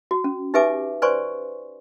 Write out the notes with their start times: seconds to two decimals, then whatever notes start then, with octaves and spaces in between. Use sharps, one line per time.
0.11 F#4
0.24 C#4
0.54 D#4 G4 B4 E5 G#5 D6
1.02 B4 C5 D5 G#5 C6 C#6